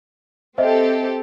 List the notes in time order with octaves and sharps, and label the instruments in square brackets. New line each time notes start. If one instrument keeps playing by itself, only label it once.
[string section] C4 G4 A4 [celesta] C5 D#5 E5